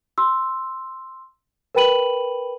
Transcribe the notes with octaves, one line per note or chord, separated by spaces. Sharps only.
C6 E6
A#4 B4 G5 B5 D#7 F#7